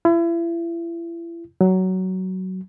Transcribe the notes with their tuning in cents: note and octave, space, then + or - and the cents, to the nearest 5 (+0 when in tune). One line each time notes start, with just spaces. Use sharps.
E4 +35
F#3 +15